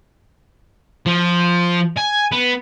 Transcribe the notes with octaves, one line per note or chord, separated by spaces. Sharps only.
F3
G#5
B3